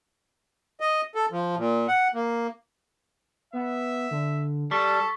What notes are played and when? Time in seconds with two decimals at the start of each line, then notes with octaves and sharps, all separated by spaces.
0.80 D#5
1.15 A4
1.32 F3
1.57 A#2
1.88 F#5
2.14 A#3
3.53 B3 E5
4.11 D3
4.71 G3 A4 A5 C#6 B6